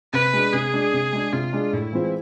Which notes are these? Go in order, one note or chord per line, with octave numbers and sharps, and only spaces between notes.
C3 B4
G#3 D4
C3 G#4
G#3 D4
C3
G#3 D4
C3 F4
G#3 D4
A2 E4
E3 G#3 C4 F4